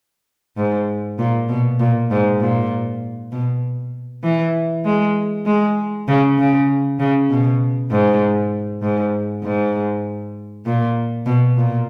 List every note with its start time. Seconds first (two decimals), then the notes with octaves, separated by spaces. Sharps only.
0.57 G#2
1.19 A#2
1.49 B2
1.80 A#2
2.11 G#2
2.41 A#2
3.32 B2
4.23 E3
4.85 G#3
5.46 G#3
6.08 C#3
6.38 C#3
6.99 C#3
7.30 B2
7.91 G#2
8.82 G#2
9.43 G#2
10.66 A#2
11.26 B2
11.57 A#2